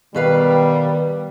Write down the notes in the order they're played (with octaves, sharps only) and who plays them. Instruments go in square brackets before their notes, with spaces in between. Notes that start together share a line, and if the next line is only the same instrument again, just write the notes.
[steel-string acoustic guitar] B2 B4 F5 [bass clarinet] D#3 [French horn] G3